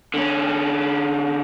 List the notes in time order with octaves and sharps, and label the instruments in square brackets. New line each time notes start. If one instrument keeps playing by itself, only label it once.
[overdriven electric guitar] D3 C#4